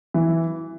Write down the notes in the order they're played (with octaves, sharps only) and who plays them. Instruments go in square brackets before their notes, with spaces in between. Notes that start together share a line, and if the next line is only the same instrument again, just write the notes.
[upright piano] E3